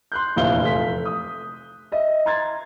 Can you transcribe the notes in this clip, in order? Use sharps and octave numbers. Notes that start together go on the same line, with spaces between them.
C6 F#6 G6
F1 A#1 E2 E5 F5 G7
F1 A3 B6
D#6
D#5 E5
A#5 C6 G#6 A6